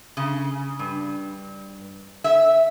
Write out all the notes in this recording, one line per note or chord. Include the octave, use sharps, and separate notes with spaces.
C#3
G2
E5